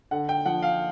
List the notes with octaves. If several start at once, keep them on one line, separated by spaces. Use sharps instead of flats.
D3 F#5
G5
F3 F#5
F5